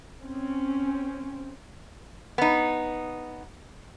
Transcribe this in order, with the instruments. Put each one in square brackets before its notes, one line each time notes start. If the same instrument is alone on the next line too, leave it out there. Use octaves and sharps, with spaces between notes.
[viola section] C4 C#4
[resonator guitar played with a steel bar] B3 D#4